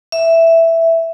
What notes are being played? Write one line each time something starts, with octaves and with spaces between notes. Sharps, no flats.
E5